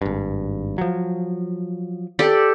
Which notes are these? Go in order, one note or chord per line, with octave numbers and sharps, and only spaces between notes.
G#1 G2
F3 F#3
G4 A4 D5